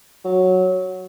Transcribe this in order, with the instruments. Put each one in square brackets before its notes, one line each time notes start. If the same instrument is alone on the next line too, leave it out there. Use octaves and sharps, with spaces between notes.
[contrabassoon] F#3